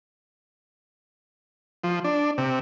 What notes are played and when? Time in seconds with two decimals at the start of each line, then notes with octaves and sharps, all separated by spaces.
1.84 F3
2.04 D4
2.38 C3